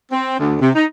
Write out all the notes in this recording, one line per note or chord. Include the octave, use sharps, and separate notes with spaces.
C4
D2
C3
D#4